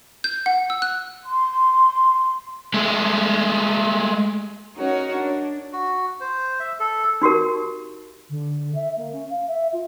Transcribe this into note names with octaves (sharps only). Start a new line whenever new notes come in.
G6
F#5
E6
F#6
C6
G#3 A3
C#4 D#4 F#4 A#4 C#5
D4
F#4
C5
E5
A4
D#4 F#4 G4 A#4
D3
E5
A#3
C#4
F5
E5
F4